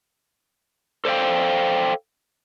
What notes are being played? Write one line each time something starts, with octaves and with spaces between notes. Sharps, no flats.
A4 C5 D5 D#5 F5 G5